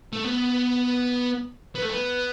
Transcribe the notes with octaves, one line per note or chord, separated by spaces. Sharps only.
A3
B3
B3
A3
B3